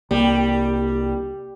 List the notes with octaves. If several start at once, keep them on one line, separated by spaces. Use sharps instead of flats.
C2 G3 A#3